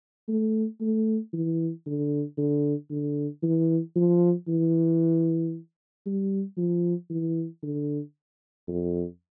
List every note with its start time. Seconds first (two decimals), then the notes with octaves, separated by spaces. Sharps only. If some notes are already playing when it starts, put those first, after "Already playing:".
0.28 A3
0.81 A3
1.33 E3
1.86 D3
2.38 D3
2.90 D3
3.43 E3
3.96 F3
4.48 E3
6.06 G3
6.57 F3
7.10 E3
7.63 D3
8.68 F2